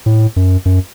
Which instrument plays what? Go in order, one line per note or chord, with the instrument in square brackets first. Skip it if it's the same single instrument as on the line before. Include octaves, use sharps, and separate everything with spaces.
[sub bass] A2
F#2
F#2